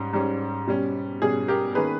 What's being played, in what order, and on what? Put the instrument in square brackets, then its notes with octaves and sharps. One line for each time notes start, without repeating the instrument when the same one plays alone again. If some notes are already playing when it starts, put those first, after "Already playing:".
Already playing: [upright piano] G#2 G3 C#4
G#2 G3 C#4
B2 G3 C#4
B2 G3 C#4 G#4
G4 A#4
D#3 A#3 C#4 G#4 B4